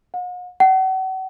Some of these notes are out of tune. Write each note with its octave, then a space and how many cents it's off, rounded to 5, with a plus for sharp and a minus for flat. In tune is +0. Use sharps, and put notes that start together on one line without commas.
F#5 -45
F#5 +40